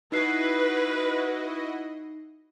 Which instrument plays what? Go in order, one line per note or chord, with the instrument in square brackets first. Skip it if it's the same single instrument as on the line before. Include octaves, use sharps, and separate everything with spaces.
[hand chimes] D#4 C7 [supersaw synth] E4 F#4 D#5 [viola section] B4